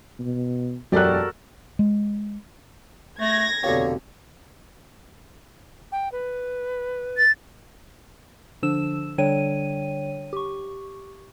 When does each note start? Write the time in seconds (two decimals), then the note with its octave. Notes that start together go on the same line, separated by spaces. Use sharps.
0.19 B2
0.92 E1 F#2 F#4 G4 A4 A#4 D5 F#6
1.79 G#3
3.20 A3 G#6 A#6
3.63 F1 B2 D3 A#3 G4 C#5
5.92 G5
6.12 B4
7.17 A6
8.63 D3 F3 D4 E6 E7
9.18 D3 G3 D4 C#5 G5 D#7
10.33 G4 C#6